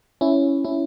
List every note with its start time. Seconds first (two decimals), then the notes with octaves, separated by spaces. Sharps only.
0.21 C#4 E4
0.64 C#4 E4